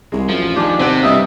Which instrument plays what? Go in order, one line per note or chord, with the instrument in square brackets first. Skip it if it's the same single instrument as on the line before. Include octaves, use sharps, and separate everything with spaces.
[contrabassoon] C2 [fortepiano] G#3
[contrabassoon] F#2 [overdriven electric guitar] F3
[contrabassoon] A1
[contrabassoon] D#2 [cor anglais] D4 [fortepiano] G4 G#5
[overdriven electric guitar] C3 [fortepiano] C4 F#5
[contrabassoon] G2 [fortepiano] D4 E4 E5 [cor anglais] D#5